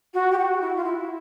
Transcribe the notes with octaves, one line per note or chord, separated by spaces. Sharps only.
F#4
G4
F#4
E4
F4
E4